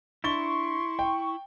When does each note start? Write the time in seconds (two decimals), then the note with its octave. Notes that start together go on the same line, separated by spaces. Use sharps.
0.24 D4 E4 C6 C#6 A6 G7
0.99 G5